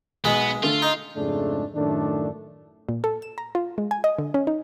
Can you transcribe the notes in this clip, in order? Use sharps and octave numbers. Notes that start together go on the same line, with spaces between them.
B1 G#3 B3
D3 A3 F4
D#4
F2 G#2 C#3 G#3 A3 D4
F#2 A2 D#3 A3 D4
A#2
A4
E7
A#5
F4
G#3
G#5
D#5
D3
C#4
D#4